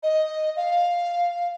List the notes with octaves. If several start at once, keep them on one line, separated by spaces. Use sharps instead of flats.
D#5
F5